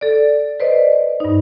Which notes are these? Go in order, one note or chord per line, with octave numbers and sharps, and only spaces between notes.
A4 D5
B4 C5 D5 D#5
G2 D#4